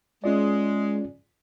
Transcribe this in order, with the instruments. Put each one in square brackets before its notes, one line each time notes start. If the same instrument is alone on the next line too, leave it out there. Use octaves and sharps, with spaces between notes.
[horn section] G#3 [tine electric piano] C#4 F4 D5